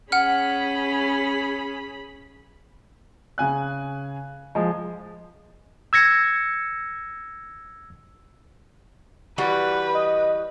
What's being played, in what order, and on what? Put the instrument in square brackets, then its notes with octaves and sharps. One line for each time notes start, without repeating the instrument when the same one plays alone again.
[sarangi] C#4 [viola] G#4 B5 [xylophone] F#5 F6
[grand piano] C#3 G#5 F#6
F3 G#3
[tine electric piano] E6 G#6 A#6 C#7
[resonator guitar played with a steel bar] E3 G3 F#4 [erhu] B4
[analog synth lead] D#5